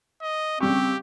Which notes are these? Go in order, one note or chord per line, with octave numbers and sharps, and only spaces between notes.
D#5
C#3 G3 C4 G4 C#6